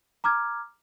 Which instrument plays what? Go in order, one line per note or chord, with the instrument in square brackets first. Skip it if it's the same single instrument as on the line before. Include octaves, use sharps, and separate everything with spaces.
[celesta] A#5 D6 F6 G#6